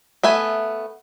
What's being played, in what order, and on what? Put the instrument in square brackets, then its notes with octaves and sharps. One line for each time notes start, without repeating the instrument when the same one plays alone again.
[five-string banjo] A3 B3 E5 G#5